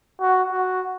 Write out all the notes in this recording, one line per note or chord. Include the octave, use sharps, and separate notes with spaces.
F#4
F#4